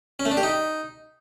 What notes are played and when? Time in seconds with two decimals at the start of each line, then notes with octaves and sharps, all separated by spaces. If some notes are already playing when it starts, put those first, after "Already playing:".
0.19 C#4
0.25 A3
0.31 D4
0.37 G4
0.43 D#4